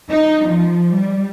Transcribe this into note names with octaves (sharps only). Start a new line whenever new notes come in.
D#4
F3
G3